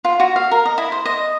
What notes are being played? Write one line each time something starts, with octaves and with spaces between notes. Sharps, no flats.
F4
F#4
F5
A#4
D#5
E4
C5
D#5